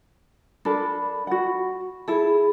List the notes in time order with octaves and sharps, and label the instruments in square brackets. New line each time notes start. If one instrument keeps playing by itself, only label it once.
[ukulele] D4 A4 A#4 [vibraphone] B5
[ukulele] F#4 F#5
[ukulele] E4 A4 [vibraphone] G#4 B5